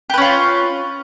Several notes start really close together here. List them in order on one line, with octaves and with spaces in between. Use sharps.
G4 B4 C#4 F4